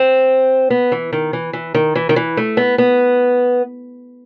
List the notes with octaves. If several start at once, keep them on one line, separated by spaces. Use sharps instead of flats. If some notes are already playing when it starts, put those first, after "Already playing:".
Already playing: C4
B3
E3
D#3
E3
E3
D#3
E3
D#3
E3
A3
B3
B3